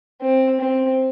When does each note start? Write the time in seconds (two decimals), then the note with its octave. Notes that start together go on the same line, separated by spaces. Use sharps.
0.21 C4
0.60 C4